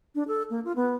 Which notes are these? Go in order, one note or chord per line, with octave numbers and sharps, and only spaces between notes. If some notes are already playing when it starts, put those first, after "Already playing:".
D4
A4
A#3
F4
B3